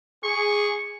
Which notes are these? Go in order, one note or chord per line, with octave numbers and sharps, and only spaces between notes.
G#4 C#6